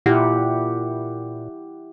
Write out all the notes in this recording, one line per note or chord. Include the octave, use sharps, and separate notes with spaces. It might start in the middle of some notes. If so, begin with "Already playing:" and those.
A#2 E4 G4 F#5